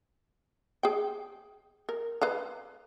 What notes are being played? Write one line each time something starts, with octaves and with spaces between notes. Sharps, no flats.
G#4 G5
A#4
B4 F5 A#5